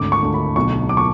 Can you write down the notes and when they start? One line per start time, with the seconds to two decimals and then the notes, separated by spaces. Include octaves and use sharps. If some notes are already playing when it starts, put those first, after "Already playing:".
Already playing: G#1 D2 D6
0.12 C#6
0.23 D2
0.34 B5
0.56 B1 C#6
0.89 D6
0.97 C#6